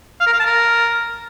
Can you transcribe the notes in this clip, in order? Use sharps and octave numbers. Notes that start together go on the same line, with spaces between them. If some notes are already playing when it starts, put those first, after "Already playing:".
F5
A#4
F5
A5
A#4